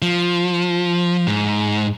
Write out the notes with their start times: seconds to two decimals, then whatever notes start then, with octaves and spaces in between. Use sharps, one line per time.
0.02 F3
1.27 G#2